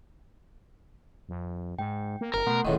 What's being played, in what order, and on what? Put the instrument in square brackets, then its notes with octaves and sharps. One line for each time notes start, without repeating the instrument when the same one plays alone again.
[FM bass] F2
[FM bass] G#2 [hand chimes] G5
[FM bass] A#3
[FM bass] F#1 [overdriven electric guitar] A#4
[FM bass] B2 [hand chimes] A3 F#5 C6
[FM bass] D#1 [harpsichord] C#2 A2 D#3